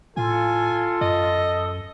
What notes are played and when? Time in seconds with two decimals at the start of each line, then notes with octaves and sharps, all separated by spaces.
0.17 A2 F4 A4 G#5
1.01 F#2 D#5